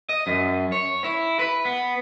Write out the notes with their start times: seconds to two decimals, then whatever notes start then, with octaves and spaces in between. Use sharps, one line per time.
0.09 D#5
0.27 F#2
0.72 C#5
1.04 E4
1.39 B4
1.65 B3